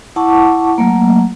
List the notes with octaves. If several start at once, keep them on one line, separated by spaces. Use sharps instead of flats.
E4 F#5 A5 C#6 D6
F#3 A3 A#3